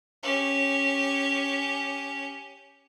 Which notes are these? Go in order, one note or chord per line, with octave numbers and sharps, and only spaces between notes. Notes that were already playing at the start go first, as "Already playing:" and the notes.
C#4 G4